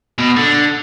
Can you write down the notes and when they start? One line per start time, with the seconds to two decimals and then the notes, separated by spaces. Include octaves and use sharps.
0.18 B2
0.36 D3